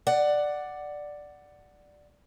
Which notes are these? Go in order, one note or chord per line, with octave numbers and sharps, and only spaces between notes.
D5 F#5